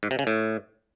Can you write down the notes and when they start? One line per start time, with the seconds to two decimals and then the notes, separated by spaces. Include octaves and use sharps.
0.03 G#2
0.11 C3
0.19 C#3
0.27 A2